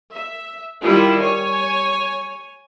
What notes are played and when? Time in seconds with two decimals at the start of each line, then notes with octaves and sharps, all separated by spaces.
0.12 E5
0.83 D#3 G3 E4 F4
1.20 C#5 G#5